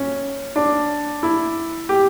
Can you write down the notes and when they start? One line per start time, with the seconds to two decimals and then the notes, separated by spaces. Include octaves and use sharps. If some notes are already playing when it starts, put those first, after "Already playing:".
Already playing: C#4
0.56 D4
1.23 E4
1.89 G4